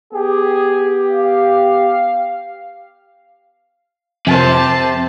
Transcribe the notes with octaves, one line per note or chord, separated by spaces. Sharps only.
B3 G4 G#4
F5
F2 C3 C5 A5